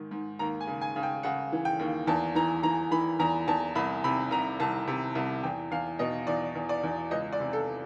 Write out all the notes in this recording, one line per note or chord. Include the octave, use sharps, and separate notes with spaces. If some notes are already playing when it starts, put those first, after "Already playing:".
Already playing: G#2 D#3
G#2
D#2 A#5
G#5
C#3
G#5
C#3
G5
C#3 F#5
E3
G5
D#2
E2 A5
E3 A#5
E3 A#5
E3 B5
E2 A#5
E2 A5
C2 B5
C3 B5
C2 A#5
C2 A5
C3
C2
E2 G5
E2 F5
B2 D#5
E2 D5
E2
D5
E2
C#2 D#5
D5
C3
A4